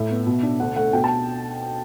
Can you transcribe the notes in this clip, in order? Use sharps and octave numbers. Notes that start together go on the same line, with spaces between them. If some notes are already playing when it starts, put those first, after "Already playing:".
Already playing: A2 E5
B3
B2
D4
D2 F#5
A3 F#5
B2 G5
A5